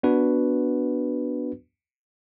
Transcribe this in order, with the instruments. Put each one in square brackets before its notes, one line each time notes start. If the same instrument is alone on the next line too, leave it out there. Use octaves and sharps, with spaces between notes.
[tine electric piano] B3 D4 F#4 B4